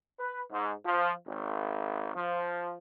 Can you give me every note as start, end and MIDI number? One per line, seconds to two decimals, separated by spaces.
0.19 0.41 71
0.52 0.72 44
0.86 1.12 53
1.27 2.12 32
2.14 2.77 53